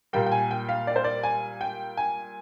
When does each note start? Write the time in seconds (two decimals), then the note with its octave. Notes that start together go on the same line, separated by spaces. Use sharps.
0.13 A#2 G3 A#3 G5
0.26 G5
0.32 G#5
0.51 G5
0.69 F5
0.87 D5
0.96 C5
1.04 D5
1.23 G#5
1.61 G5
1.97 G#5